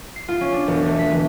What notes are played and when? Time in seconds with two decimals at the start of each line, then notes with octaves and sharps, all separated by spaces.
0.16 C7
0.28 F4
0.41 C#4
0.53 D4
0.67 E1
0.86 A3
0.99 B6
1.12 E3